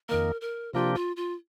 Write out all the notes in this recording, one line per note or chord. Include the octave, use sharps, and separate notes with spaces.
F2 D#3 A#3 A#4
A#4
C3 F3 A#3 D4 F4 G4
F4
F4